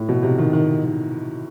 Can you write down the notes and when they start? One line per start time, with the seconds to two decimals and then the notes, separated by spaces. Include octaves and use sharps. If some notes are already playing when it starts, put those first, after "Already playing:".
Already playing: A2
0.09 B2
0.23 C3
0.38 D#3
0.53 D#3
0.84 D#3